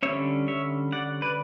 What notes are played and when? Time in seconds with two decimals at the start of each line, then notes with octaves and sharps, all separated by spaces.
0.03 D3 G3 C#4 C#5 E5
0.48 C#5 E5
0.92 D5 F#5
1.22 B4 D5